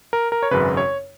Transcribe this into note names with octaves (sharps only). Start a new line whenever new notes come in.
A#4
A#4
C#5
G#1 F#2 C#3 B4
C#5